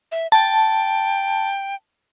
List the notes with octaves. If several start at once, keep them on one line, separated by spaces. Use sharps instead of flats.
E5
G5 A5